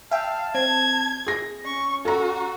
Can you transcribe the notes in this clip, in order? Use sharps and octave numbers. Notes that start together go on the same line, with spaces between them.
E5 F5 G5 A5
C4 G#6
G#4 A#6
C#4 C#6
F#4 A4 A#5